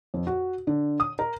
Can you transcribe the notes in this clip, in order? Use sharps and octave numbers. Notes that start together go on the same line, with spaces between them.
F2
F#4
D3
D#6
A#4